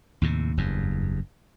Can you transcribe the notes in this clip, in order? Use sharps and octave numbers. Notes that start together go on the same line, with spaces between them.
D#2 A2 C3
F#1 E2 G2